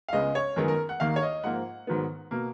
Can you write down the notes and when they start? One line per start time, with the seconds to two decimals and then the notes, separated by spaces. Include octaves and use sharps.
0.08 F5
0.13 C#2 C#3 G#3 B3 D#5
0.35 C#5
0.56 F#2 D#3 G#3 B3 A#4
0.68 A#4
0.89 F#5
1.00 D#2 D#3 A#3 F5
1.16 C#5
1.22 D#5
1.44 G#2 F3 A#3 F#5
1.87 G#2 D#3 F#3 B3
2.31 B2 A#3